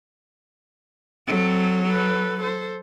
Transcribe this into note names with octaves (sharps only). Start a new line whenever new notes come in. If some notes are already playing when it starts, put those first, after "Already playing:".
F#3 C4 A4
A4 B4
A4 C5